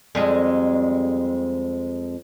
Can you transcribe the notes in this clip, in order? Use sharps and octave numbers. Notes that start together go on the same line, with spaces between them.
F2 G3 G#3